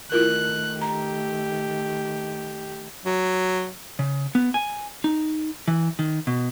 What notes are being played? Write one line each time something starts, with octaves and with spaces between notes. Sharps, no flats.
D#3 A3 E4 F4 A#4 F#6
G4 A#5
F#3
C#3
B3
G#5
D#4
E3
D#3
B2